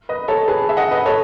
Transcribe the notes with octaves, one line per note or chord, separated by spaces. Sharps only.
B4 D#5
A4 C#5
G#4 B4
E5
D#5 F#5
B4 D#5
A4 C#5